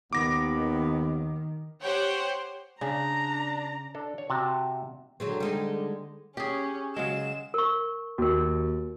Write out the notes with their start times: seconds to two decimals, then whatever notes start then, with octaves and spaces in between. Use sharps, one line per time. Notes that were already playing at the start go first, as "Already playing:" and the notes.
0.13 D#2 D#3 B3 D6 A#6
1.83 G4 C5 C#5 F#5 G5
2.81 C#3 D4 A#5
3.95 D4 A4
4.18 C#5
4.30 C3 F#4 A5
5.20 D3 F#3 G#3 C4
5.40 G3 G#3 D#4
6.37 C#4 G4 G#4
6.96 C#3 F#3 G#3 E7
7.54 A#4 C#6
8.18 D#2 F#4 A#4